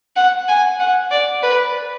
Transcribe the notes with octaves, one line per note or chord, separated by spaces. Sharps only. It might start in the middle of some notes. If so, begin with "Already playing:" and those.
F#5
G#5
F#5
D5
B4